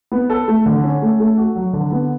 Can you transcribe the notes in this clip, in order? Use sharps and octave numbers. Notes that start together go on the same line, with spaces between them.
B3
A4
A3
D3
C#4
A3
A3
F#4
F#3
D3
B3